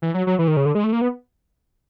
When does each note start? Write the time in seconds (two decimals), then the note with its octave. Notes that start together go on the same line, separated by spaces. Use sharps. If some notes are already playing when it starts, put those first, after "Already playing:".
0.02 E3
0.14 F#3
0.27 F#3
0.39 E3
0.48 D#3
0.57 C#3
0.66 D3
0.75 G#3
0.84 A3
0.93 A#3
1.02 B3